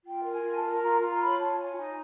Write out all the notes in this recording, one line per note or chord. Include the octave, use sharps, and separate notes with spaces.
F4 G5
A#4
G#5
F4
A5
A#4
F4 A#5
F4 A#5
C#5 B5
F4 A5
C#5 G#5
D#4 G#5